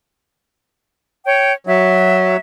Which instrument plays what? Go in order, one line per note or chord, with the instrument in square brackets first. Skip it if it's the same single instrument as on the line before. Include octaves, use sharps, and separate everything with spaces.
[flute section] C#5 G5
[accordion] F#3 [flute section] E5